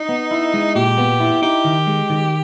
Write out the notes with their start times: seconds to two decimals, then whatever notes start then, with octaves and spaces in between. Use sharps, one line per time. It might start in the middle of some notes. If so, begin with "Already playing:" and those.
Already playing: D#4
0.09 B3
0.31 E4
0.54 G#3
0.76 A#2 G4
0.98 B3
1.20 E4
1.42 D#4 G4
1.65 D#3
1.87 G#3
2.10 D#3